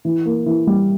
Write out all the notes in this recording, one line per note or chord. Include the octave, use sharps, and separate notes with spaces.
E3
A#3
E3
G3